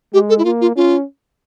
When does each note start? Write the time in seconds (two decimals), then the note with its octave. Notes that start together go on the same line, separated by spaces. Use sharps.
0.14 G#3 G4
0.29 A4
0.38 E4
0.45 A#3 F4
0.61 F4
0.76 C#4 F4